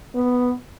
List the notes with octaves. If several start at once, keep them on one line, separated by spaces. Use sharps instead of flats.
B3